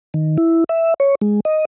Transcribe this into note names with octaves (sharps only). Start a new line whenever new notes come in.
D#3
E4
E5
C#5
G#3
D#5